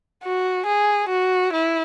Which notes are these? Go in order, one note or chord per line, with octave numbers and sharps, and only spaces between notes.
F#4
G#4
F#4
E4